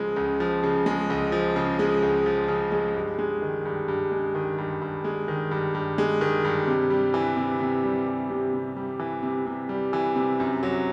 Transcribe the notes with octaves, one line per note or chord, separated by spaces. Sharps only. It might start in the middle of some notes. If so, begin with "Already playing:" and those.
Already playing: C#2 C#3 F3 G#3
C#2
F3
C#3
G#3
C#2
F3
C#3
G#3
C#2
F3
C#3
G#3
G2
G#3
D#3
G2
G2
G#3
D#3
G2
G2
G#3
D#3
G2
G2
G#3
D#3
G2
C3
G3
E3
C3
C3
G3
E3
C3
C3
G3
E3
C3
C3
G3
E3
C3
F#2
F#3